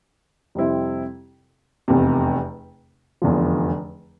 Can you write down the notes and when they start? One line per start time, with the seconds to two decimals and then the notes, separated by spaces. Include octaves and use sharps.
0.55 F2 C3 G3 C4 E4
1.88 F1 E2 C3
3.22 F1 E2 D3 F3